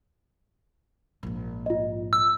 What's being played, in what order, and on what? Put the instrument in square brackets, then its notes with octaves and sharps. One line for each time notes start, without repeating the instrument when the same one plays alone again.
[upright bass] A#1 G#2
[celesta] F4 D#5
[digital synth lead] E6